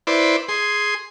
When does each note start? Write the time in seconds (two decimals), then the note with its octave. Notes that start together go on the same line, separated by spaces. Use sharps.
0.07 E4 B4 C5 D5
0.48 G#4 C6